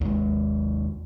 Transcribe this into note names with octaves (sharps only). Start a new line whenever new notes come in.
D#2 G#3